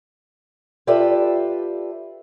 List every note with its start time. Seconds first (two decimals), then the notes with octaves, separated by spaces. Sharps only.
0.87 F4 G4 A4 B4 D5 E5